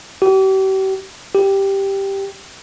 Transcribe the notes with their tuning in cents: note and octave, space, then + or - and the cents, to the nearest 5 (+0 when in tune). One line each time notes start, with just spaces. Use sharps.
G4 -40
G4 +0